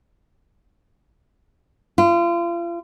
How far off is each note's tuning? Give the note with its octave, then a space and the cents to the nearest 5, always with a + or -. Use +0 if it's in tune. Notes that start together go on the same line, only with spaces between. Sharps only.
F4 -35